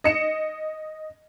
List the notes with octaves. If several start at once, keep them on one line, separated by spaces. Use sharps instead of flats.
D#5 C#7 E7